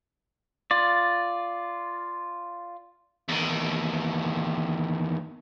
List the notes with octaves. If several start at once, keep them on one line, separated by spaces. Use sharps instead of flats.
F4 D5
E2 D#3